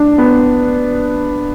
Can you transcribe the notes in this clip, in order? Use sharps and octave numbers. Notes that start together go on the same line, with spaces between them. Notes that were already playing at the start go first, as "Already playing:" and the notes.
Already playing: D4
B3